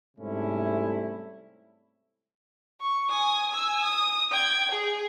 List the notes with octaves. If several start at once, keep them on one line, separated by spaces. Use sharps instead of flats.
G#2 C3 G3 A3 C#4 E4
C#6
G#5 D#6
G#5 E6
D#6
G5 G#6
G#4